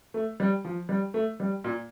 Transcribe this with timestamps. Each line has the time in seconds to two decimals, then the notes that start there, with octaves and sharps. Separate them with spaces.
0.14 A3
0.40 G3
0.65 F3
0.89 G3
1.14 A3
1.40 G3
1.64 A#2